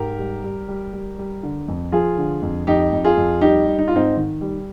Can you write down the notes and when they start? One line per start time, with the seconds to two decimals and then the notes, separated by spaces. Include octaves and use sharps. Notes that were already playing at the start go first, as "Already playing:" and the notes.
Already playing: G#2 G4 A#4
0.18 G3
0.43 G3
0.68 G3
0.93 G3
1.19 G3
1.43 D3
1.68 F2
1.92 F3 F4 G#4
2.17 D3
2.42 F2
2.67 F2 D#4 G4
2.92 F2
3.04 F4 G#4
3.17 F2
3.41 G3 D#4 G4
3.67 G3
3.79 D#4
3.88 F4
3.92 G#2 C4 D#4
4.17 D#3
4.41 G3